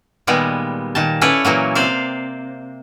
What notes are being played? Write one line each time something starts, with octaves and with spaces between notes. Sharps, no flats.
A#2 D#3 G3 G#3 B3
A#2 D#3 A5
C#4 E4 A4 B4 C#5 D5
A#2 E3 F#3 A#3
C3 C5 D5 F5